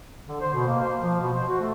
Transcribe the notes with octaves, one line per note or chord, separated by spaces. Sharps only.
D3
C5
B2
A#3
C5
F3
B2
C5
F#4
A3